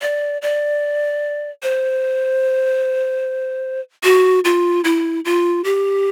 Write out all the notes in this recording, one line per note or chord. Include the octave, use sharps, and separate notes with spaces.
D5
D5
C5
F#4
F4
E4
F4
G4